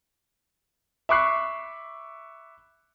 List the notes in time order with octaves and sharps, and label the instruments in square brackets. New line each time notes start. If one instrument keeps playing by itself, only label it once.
[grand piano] E5 B5 C#6 D6 F#6 C7